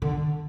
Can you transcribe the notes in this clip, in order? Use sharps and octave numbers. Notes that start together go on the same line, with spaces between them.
D3